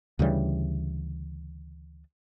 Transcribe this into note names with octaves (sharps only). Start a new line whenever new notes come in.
D2 C#3 E3 G3